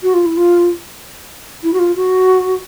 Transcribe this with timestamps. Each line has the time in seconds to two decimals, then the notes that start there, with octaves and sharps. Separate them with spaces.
0.03 F#4
0.14 F4
0.25 E4
0.36 F4
1.63 E4
1.73 F#4
1.79 F4
1.95 F#4